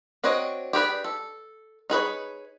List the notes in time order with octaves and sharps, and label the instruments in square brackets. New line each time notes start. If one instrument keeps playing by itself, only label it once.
[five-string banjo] C4 D4 F#4 C#5 D#5
G4 G#4 B4 D5
A4
D#4 G#4 B4 C#5